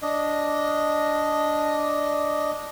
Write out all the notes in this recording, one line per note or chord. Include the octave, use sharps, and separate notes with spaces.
D4 D#5